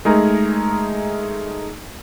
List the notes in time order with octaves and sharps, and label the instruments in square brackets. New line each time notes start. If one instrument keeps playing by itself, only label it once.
[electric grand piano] G#3 A3 D#4 G#4 A#4 A#5